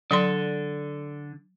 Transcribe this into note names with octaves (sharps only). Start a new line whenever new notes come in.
D3 F#3 D5 C6